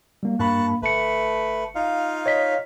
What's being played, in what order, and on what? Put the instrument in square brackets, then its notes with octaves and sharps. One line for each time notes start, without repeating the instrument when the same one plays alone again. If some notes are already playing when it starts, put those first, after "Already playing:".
[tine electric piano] G3 A#3
[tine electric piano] G2 A#3 B5 [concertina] A5 C#6 F#6
[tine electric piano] G1 C#7 [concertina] A3 B4
[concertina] D#4 F4 F5
[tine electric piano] C#5 D#5 B6